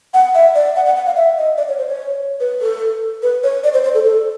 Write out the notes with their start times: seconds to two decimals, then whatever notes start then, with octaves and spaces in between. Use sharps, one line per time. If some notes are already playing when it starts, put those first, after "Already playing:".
0.14 F#5
0.35 E5
0.55 D5
0.76 F#5
0.86 F#5
0.96 F#5
1.06 F5
1.16 E5
1.38 D#5
1.58 D5
1.69 C#5
1.78 C5
1.89 C#5
2.40 B4
2.61 A4
3.23 B4
3.43 C#5
3.64 D5
3.74 C5
3.84 C5
3.94 A4
4.05 A4